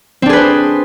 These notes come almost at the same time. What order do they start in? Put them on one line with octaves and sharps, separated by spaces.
C4 D4 G#4 B4 C5